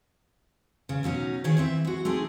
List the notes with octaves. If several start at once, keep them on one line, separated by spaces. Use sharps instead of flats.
C#3
B2 F#3 C#4 D#4
D#3 G#4 C#5
E3 C4 E5
G#3 F#4
A3 C4 D#4 G#4